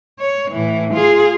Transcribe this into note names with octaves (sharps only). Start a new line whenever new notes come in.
C#5
A2 E3
F4 G#4